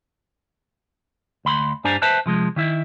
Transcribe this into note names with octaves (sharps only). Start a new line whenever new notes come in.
D2 B5 C6
G2 G3 D4 C5 G#5 A#5
B4 C5 E5 A5
C3 F3 G#3
D#3 E4 E5